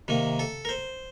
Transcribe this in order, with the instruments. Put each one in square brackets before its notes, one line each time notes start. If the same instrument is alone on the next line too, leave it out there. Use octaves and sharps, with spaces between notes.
[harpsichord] C3 D#3 A#3
A4
A#4
C5